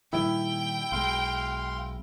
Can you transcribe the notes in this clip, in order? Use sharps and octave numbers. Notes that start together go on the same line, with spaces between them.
A#2 D#3 G3 E4 G5
B1 B2 G#3 F5 C6